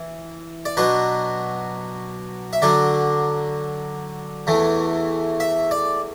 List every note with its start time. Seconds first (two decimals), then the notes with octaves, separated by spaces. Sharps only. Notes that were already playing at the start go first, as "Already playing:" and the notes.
Already playing: E3
0.65 D5
0.77 B2 F#3 D4 B4
2.53 E5
2.62 D3 F#3 D4 D5
4.47 E2 E3 A3
5.40 E5
5.71 D5